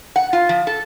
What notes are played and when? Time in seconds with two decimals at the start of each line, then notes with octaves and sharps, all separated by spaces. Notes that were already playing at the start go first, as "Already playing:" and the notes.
0.16 F#5
0.33 F4
0.49 F3
0.67 A4